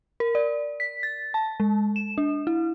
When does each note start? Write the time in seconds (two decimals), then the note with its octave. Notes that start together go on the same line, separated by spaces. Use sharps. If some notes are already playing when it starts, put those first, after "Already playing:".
0.20 A#4
0.35 D5
0.80 B6
1.03 A6
1.34 A5
1.60 G#3
1.96 E7
2.18 D4
2.47 E4